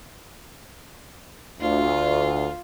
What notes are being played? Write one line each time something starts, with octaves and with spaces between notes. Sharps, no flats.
D2 F4